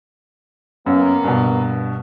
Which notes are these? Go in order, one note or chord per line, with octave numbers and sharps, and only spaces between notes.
F#2 A#3 B3
G2 B2